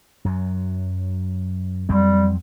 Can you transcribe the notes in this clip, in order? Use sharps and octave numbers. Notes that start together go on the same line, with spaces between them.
F#2 F#3
F2 F#3 G3 C4